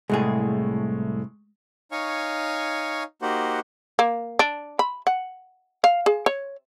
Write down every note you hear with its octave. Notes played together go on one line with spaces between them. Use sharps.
C2 A2 G#3 A3 G#4
D#4 C#5 F5 G#5 C#6
A#3 D#4 F#4 G4 C5 F#5
A#3
D4
B5
F#5
F5
G#4
C#5